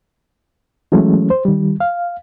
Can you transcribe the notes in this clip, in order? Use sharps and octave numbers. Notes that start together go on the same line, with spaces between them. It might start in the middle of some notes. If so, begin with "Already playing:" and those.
E3 F#3 G#3 A3 C#4
C5
D#3 G3
F5